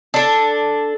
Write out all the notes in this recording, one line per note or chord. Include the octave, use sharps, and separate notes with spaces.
D4 A4